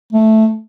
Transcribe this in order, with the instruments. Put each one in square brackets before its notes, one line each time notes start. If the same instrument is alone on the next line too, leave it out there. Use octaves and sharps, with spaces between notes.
[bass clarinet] A3